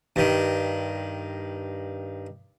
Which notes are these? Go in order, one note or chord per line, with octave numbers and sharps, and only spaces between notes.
G2 D#3